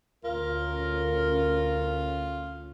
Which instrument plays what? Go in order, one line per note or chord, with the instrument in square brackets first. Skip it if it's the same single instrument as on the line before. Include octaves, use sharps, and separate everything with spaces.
[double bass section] D2 C#4 [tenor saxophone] F4 [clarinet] A#4